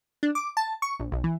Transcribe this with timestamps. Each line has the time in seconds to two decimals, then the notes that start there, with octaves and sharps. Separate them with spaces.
0.23 D4
0.35 D6
0.57 A5
0.82 C#6
1.00 A#1
1.12 B1
1.24 E3